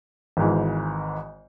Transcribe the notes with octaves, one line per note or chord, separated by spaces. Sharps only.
G#1 G#2 E3